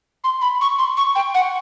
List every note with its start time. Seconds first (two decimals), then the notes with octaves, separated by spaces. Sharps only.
0.24 C6
0.42 B5
0.61 C#6
0.79 C6
0.97 C#6
1.16 G5
1.34 F#5